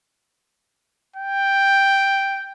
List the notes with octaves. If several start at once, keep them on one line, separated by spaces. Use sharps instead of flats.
G5